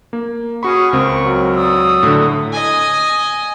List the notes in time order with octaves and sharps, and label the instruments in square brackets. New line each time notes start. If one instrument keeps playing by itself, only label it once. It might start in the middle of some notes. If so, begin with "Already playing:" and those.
[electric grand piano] A#3
[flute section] C#4 G#4 D#6 [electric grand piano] F#4 B5 [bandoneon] C#6
[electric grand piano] C#2 C4 [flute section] A#4
[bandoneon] F#3
[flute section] D5 D#6 E6
[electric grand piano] A2 D3
[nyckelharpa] D#5 G#5